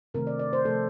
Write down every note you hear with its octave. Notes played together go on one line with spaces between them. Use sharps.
C3 D#3 A3 C4 A#4
D5
D5
C5
C3 F3 A3 A4